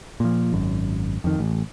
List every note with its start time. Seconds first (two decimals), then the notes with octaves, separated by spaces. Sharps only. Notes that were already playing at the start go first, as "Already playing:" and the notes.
0.20 A#2 F3
0.52 G#1 F#2
1.24 F2 D#3
1.39 A1